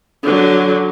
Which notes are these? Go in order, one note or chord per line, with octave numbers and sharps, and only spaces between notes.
D3 F#3